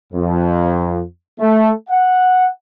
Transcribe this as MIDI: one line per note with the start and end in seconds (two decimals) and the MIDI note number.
0.13 1.01 41
1.39 1.71 57
1.90 2.48 78